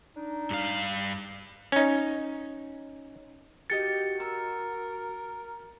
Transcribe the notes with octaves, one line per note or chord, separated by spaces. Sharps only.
D4 D#4
G2 F5
C#4 D#4
D#4 F#4 G4 A#4 A6 C#7
A#4 E6